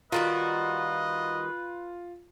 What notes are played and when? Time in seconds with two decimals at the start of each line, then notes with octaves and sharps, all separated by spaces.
0.12 D#3 G3 F4 F#4 B4 D#5